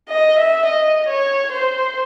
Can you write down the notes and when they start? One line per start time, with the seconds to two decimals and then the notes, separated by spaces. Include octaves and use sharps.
0.10 D#5
0.39 E5
0.66 D#5
1.09 C#5
1.52 C5